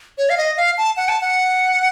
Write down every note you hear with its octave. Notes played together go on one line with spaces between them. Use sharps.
C#5
F5
D#5
F5
A5
F#5
A5
F#5